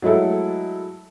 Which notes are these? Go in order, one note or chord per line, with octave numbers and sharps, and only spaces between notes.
F#3 G#3 A3 E4 A4